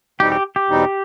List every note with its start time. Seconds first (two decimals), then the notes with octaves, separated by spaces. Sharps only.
0.20 E2 B2 G3 C4 D#4 G4
0.32 G4
0.56 G4
0.68 E2 B2 G3 C4 D#4